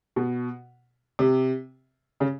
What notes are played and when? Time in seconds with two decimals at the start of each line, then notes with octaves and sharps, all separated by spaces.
0.16 B2
1.19 C3
2.20 C#3